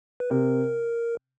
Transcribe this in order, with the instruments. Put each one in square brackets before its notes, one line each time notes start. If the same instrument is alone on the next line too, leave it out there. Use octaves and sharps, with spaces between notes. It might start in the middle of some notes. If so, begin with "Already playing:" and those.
[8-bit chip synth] B4
[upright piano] C3 [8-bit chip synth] A#4